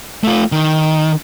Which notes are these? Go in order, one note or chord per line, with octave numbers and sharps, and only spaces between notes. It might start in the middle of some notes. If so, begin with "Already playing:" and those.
A3 F4
D#3